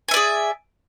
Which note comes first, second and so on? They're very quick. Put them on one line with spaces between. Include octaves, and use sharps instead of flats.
G#5 E5 D5 G#4